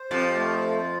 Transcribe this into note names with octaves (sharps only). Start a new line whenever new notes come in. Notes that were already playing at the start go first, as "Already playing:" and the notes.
Already playing: C5
F2 F3 G4
A3